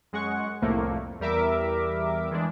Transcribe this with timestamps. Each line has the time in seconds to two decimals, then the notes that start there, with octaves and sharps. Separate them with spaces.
0.12 F#2 G#3 F#5 C#6
0.62 C2 F2 A2 C3 A3 A#3
1.20 E2 G3 A#4 E5 D6
2.31 E3 G#3 D4